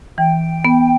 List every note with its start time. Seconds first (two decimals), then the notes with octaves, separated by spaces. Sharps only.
0.18 E3 G5
0.65 B3